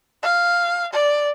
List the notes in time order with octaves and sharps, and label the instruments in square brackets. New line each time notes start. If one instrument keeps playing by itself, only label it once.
[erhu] F5
D5